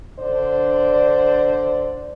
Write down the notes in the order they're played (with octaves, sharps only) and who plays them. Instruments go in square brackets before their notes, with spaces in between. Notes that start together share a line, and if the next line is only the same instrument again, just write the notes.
[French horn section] D3 D4 C5 D5